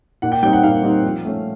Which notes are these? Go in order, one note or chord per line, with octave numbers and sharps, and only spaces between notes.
A#2 F#5
G5
G3 C4 D#4 G5
F#5
A#2 F5
G3 C4 D#4
F3
A3 C#4